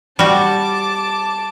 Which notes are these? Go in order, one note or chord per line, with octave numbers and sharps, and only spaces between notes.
G3 F#4 A5 D6